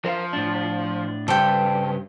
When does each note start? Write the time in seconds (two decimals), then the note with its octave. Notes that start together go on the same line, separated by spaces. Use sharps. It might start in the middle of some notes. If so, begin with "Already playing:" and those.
0.05 F3 A#4 C5 F5
0.33 A2 D4
1.28 G2 C#3 G4 A4 C5 G5